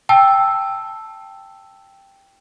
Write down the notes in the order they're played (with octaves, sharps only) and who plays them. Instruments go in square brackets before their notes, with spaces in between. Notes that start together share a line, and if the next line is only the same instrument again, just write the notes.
[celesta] G5 A5 E6